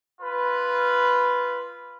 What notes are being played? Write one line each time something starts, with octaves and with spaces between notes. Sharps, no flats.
F4 B4